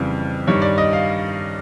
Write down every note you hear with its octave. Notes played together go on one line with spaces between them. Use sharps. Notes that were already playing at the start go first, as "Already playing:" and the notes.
Already playing: F2 C#3 E3 G3
G2 D#3 G3 C#5
D5
D#5
F5